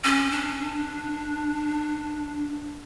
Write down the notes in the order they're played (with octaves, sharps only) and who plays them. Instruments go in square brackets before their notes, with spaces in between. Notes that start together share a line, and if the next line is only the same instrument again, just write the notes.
[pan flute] C#4
D4